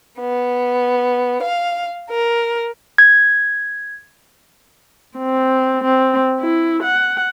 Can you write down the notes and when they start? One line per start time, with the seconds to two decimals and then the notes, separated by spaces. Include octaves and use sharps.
0.19 B3
1.42 F5
2.09 A#4
2.98 G#6
5.18 C4
5.84 C4
6.40 E4
6.83 F#5